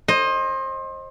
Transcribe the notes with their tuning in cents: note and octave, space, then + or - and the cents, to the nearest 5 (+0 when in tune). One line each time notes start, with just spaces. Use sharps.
C5 +30 D#5 +0